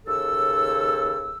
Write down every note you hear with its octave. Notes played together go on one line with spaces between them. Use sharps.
D#2 C#3 A4 E6